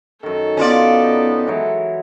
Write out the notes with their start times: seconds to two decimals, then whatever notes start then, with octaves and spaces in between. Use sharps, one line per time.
0.23 F#2 D#3 A4
0.57 B3 C#4 F4 D5
1.03 D#4
1.47 E3 F#3 G#3